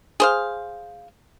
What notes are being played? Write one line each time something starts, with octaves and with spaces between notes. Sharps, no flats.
G#4 C5 F5